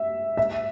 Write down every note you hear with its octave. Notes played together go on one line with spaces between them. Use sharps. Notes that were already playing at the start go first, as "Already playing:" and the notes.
Already playing: E5
E5